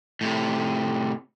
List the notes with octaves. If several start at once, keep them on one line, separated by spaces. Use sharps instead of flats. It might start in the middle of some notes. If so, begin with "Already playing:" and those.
A2 C3